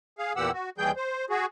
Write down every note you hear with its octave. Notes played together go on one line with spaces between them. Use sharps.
G#4 F5
E2 A#2 E3 G4 F#5 E6
F#4
D#2 E3 G3 G#4 G5 G6
C5
F#4 G#4